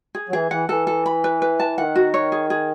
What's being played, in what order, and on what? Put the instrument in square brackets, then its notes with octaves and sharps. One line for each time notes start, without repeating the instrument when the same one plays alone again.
[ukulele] G#4
[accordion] F#3
[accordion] E3 [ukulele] G#4
[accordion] E3 [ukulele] F#5
[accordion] E3 [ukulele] A4
[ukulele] A4
B5
B4
B4
A5
[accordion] D#3 [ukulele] F#5
[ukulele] F#4
C#5
G#4
G#4